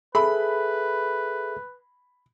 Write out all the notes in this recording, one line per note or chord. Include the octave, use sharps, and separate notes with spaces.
G#4 A4 B4 E5 B5